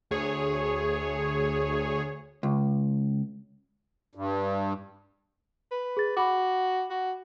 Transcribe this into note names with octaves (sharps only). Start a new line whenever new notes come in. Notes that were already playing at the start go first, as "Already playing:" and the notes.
D2 G#4 C#5
C#2
G2
B4
G#4 A6
F#4 B5 D6
F#4